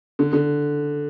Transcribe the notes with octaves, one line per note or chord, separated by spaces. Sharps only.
D3
D3